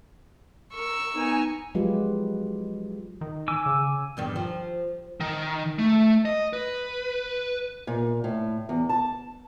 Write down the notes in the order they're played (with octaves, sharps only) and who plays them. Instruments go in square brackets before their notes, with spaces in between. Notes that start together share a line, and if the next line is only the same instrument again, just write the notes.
[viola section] A#4 [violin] C#6 E6
[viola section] B3 G#5 A#5 [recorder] D#4
[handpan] F3 F#3 G#3 F4 G4 B4
[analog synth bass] D#3
[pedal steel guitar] G#5 D6 E6
[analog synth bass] C#3
[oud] E2 G2 D#3
F3
[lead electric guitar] D#3
A3
D#5
B4
[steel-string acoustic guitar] A#2
A2
E2
A5